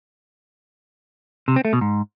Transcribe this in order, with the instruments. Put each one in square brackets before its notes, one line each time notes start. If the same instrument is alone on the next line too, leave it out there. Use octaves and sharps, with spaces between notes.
[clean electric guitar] C3
C4
A3
B2
G#2